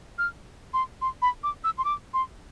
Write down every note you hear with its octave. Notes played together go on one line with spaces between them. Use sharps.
F6
C6
C6
B5
D6
E6
C6
D6
C6